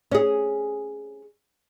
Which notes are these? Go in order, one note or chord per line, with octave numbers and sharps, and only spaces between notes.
C#4 G#4